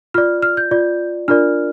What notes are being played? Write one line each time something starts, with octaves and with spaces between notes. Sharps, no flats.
F4 D5 F6
F6
G6
F4 D5
D4 F4 A#4 D5 F6